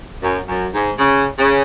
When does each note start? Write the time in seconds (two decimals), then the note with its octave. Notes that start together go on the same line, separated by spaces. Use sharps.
0.21 F#2
0.47 F#2
0.73 G#2
0.98 C#3
1.37 C#3